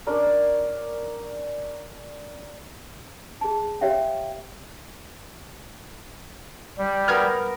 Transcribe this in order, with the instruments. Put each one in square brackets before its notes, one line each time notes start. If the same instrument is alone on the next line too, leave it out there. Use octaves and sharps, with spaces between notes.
[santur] C#4 D4 A#4 D5
[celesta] G#4 A5
G4 C#5 E5 F5 G5
[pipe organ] G3
[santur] B3 A#4 A#5 [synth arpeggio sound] F6 G#6